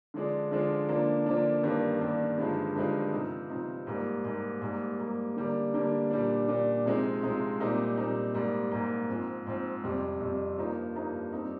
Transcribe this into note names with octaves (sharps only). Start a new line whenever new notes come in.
D3 F3 G#3 D4
D3 F3 G#3 D4
D3 F3 A#3 D4
D3 F3 A#3 D4
G2 D#3 A#3 D4
G2 D#3 A#3 D4
G2 D3 F3 G#3 D#4
G2 D3 F3 G#3 D#4
C3 F3 C4 D#4
C3 F3 C4 D#4
G#2 G3 A#3
G#2 G3 A#3
G#2 G3 A#3
G#2 G3 A#3
D3 G3 A#3 D4
D3 G3 A#3 D4
A#2 G3 D4
A#2 G3 D4
C3 F3 G#3 C4 D#4
C3 F3 G#3 C4 D#4
A#2 G3 C4 D#4
A#2 G3 C4 D#4
G#2 G3 A#3
G#2 G3 A#3
G#2 F3 C4
G#2 F3 C4
F2 C3 G3
F2 C3 G3
G2 F3 A#3 D#4
G2 F3 A#3 D#4
G3 C4 D#4